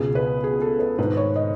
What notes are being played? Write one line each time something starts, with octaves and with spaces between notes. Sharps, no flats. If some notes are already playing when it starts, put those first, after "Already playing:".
Already playing: C#2 B2 G#4
B4
G#4
A4
B4
G#2 D#3 B4
C#5
D#5